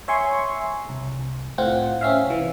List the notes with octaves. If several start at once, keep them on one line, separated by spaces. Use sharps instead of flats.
C#5 E5 G#5 C6 C#6
C2
A2 C4 F4 F#5
C4 C#4 E5 F5
C2 E3